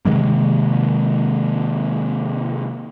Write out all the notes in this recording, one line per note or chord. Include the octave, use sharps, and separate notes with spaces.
C3 D#3 G#3 A#3